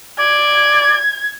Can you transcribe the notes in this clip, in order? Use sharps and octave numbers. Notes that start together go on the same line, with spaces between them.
D5 G#6